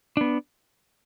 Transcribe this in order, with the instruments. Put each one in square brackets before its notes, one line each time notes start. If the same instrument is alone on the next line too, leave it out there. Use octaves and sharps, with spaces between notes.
[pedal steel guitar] B3 D4